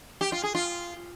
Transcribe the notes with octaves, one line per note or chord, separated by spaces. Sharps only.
G4
F4
G#4
F4